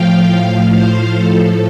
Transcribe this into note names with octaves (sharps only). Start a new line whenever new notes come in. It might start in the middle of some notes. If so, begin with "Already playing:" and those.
Already playing: A2 F3 F5 G5
A2 F3 F5
C5
A2 F3 A4